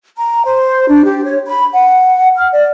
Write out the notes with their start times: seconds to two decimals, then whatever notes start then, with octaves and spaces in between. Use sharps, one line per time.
0.16 A#5
0.44 C5
0.88 D4
1.04 G4
1.24 C#5
1.45 B5
1.74 F#5
2.36 F6
2.52 D5